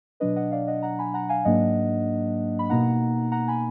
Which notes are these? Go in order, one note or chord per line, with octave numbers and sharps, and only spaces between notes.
B2 F#3 D4 B4 D#5
D#5 F#5
D5 F5
D#5 F#5
F#5 A#5
G#5 B5
F#5 A#5
F5 G#5
G#2 F#3 A#3 D4 D#5 F#5
B5
B2 A#3 D#4 F#5 A#5
F#5 A#5
G#5 B5